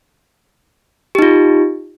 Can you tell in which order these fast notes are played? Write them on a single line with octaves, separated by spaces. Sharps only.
G4 D#4 F4